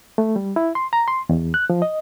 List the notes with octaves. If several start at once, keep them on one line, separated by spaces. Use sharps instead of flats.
A3
G3
E4
C6
A#5
C6
E2
F#6
F3
D#5